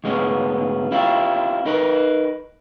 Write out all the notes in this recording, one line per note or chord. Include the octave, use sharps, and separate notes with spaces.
D2 G#2 G#3 B3 C#4
C#4 E4 F4 G4
D#4 A#4 B4